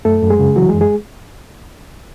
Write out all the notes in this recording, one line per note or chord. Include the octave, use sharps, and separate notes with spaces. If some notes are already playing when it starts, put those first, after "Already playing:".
F#2 A3 A4
F#2
G#3 G#4
C#3
E3 F#3 F#4
G#3 G#4
F#2
G#3 G#4